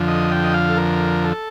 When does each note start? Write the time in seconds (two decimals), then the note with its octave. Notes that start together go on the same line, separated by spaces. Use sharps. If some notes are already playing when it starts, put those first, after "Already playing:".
Already playing: F2 D3 F3
0.08 D#5
0.31 G5
0.44 D#5
0.54 F5
0.70 A4
0.77 A#4
1.24 A4